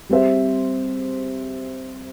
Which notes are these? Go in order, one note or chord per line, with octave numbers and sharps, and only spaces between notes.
G3 C4 G4 C5 E5